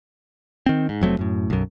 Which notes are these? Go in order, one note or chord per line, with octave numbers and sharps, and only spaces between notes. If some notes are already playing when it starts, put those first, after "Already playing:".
D#3 C4
G#2
F1 F#3 A3 C4
F#2 A2
B1 F#2